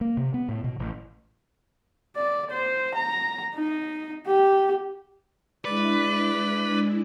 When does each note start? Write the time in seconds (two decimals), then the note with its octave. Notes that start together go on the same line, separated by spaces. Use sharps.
0.01 A#3
0.17 C3
0.34 B3
0.49 A2
0.64 B2
0.79 A1
2.16 D5
2.51 C5
2.95 A#5
3.55 D#4
4.27 G4
5.65 G#3 D4 E4 B4 D5